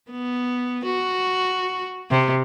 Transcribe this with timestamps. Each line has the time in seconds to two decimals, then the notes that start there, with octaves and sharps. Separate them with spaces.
0.11 B3
0.85 F#4
2.11 C3